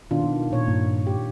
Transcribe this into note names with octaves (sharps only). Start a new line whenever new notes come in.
B2 D#3 D4 F4
B2
A#2 C#5
G2 A#3
G4